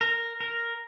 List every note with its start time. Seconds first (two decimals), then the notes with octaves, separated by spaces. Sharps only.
0.01 A#4
0.40 A#4